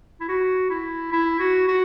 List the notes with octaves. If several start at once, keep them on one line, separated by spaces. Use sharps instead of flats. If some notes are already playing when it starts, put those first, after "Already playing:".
E4
F#4
E4
E4
F#4
F#4